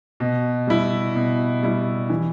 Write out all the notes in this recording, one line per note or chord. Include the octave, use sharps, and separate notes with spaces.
B2
G3 E4
B2
G3 E4
E3